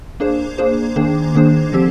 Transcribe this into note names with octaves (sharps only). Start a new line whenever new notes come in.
A#3 D4 G#4 C5
A#3 D4 G#4 C5
D#3 A#3 D4 G#4 C5
D#3 A#3 D4 G#4 C5
D3 F3 C4 G4 C5